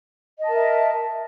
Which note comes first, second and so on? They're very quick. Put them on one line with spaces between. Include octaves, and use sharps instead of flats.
D#5 A5 A#4 E5